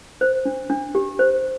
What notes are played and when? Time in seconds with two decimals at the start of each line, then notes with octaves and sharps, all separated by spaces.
0.21 C5
0.45 D4
0.70 D4
0.95 G4
1.19 C5